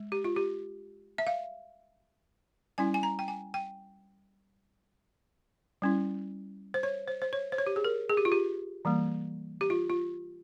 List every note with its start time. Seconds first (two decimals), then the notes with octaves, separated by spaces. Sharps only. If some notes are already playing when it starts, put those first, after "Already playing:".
Already playing: G#3
0.12 G4
0.24 F4
0.36 G4
1.18 E5
1.27 F5
2.78 G3 C#4 E4 G#5
2.94 G#5
3.03 A#5
3.19 G5
3.28 G#5
3.54 G5
5.82 G3 C#4 E4
6.74 C5
6.83 C#5
7.08 C5
7.22 C5
7.33 C#5
7.52 C5
7.58 C#5
7.67 G4
7.76 G#4
7.84 A#4
8.09 G#4
8.17 G4
8.25 F4
8.32 G4
8.85 E3 G3 A#3
9.61 G4
9.70 F4
9.90 F4